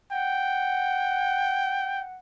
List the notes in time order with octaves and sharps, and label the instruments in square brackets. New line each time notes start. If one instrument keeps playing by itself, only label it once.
[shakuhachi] F#5 [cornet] G5